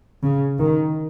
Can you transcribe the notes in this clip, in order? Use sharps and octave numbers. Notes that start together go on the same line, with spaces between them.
C#3
D#3